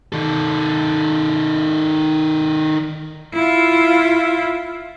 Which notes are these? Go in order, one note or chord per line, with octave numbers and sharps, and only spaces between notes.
D#3 A4
E4 F4